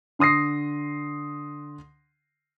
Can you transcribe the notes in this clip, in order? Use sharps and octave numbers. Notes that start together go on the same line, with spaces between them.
D3 C6 D#6 A#6 C7